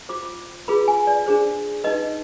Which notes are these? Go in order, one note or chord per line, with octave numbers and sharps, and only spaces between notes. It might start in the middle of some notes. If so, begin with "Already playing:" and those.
F4 C5 D6
F4 G#4 B4 B5
G#5
D5
D4 G#4 C5
D#4 B4 D#5